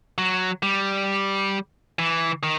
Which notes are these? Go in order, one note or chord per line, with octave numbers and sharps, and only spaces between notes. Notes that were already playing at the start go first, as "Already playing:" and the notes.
F#3
G3
E3
D#3